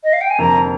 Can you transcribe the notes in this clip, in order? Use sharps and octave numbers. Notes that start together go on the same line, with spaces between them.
D#5
F5
G5
G#5
F1 F2 D3 F3 A#3 A#5